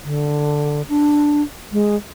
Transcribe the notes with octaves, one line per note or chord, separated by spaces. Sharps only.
D3
D4
G#3